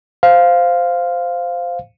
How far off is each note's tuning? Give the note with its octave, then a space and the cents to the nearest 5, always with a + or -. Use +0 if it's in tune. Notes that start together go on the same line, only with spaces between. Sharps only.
C5 -10 F5 +0